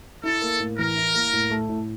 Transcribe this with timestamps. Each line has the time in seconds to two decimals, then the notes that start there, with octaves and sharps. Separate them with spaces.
0.24 E4 A4
0.42 A#3
0.60 A2
0.79 E3 A#4
0.96 E4
1.14 A#3
1.33 A2
1.50 A3
1.69 A2